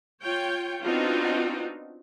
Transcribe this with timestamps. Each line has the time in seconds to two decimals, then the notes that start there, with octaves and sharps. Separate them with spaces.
0.22 F4 C#5 G5
0.83 B3 C4 D4 D#4 F4 F#4